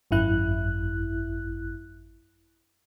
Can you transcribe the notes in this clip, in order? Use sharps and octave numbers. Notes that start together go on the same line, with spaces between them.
G#1 F#2 E4 F#6